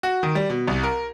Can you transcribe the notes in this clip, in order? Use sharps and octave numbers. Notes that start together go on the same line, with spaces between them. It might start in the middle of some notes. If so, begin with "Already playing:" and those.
F#4
D#3
G3
B2
C2
A#4